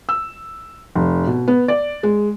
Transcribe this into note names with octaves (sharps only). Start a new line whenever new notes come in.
E6
F1
B2
B3
D5
G#3